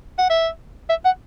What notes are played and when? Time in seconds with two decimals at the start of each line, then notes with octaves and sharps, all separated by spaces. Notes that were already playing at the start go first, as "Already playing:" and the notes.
0.19 F#5
0.30 E5
0.90 E5
1.05 F#5